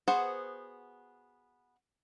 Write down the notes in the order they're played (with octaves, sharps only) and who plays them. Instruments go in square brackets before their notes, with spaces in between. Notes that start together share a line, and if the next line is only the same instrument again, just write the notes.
[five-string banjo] B3 F#4 G#4 C5 F#5